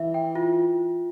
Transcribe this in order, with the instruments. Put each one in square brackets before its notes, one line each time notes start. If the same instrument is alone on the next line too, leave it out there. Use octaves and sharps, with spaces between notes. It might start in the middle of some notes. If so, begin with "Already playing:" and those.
Already playing: [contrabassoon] E3 [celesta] E5
[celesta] G5
F4